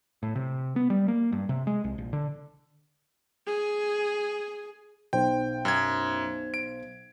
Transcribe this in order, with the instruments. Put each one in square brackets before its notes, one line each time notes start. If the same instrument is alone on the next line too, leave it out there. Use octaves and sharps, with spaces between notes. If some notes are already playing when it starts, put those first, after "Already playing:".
[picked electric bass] A2
C3
B3
G3
A#3
G2
C3
G#3
C2
A#1
D3
[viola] G#4
[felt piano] B1 C5 [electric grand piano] G5
[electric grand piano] F#2 G#6
D7